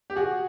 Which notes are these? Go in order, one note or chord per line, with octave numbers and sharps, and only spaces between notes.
G4
F#4 G#4